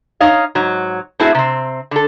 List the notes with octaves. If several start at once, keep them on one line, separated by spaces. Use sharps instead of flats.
D#4 C#5 D#5 F5
G#2 F#3
A3 C4 E4 F#4 G#4
C3 C4
D3 A4